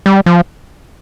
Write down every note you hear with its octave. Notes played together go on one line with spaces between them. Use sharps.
G3
F3